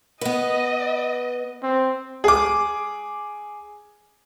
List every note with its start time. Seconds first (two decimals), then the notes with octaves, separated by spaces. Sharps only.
0.21 B3 B4 D#5
1.63 C4
2.24 G#4 D6